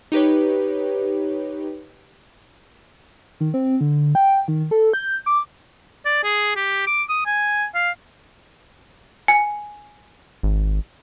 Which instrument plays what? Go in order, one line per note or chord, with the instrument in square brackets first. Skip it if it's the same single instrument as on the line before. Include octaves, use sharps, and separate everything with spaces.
[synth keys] D#4 G4 B4 C#5
[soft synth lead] D#3
C4
D3
G5
D#3
A4
G6
D6
[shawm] D5
G#4
G4
D6
D#6
G#5
F5
[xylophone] G#5
[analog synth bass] G#1